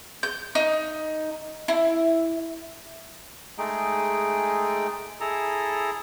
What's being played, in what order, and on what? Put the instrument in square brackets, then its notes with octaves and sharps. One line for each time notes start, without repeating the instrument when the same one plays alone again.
[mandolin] G6
D#4
E4
[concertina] G#3 A3 D#4 G#4 G5
E4 G#4 A4 A#5